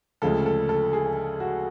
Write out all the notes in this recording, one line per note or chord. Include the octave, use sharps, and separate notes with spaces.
D2 C#3 F3 G#3 A4
A4
A4
G#4
F#4